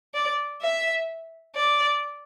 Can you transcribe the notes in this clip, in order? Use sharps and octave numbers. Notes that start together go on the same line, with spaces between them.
D5
E5
D5